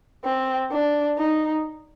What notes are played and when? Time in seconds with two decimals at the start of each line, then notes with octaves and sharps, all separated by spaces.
0.24 C4
0.71 D4
1.17 D#4